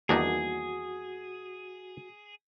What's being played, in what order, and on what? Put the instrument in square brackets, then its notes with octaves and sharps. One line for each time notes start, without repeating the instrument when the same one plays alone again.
[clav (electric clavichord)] E2 D4 D#4 [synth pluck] D#3 G3 A#3 [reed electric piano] F#4 [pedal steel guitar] G#4